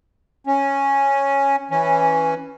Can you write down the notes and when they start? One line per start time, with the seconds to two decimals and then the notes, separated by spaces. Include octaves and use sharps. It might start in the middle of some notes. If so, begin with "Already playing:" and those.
0.47 C#4
1.71 E3 C#4